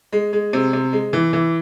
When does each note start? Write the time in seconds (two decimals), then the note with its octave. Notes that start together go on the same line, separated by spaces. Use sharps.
0.12 G#3
0.33 G#3
0.53 C3
0.73 C3
0.93 G#3
1.13 E3
1.33 E3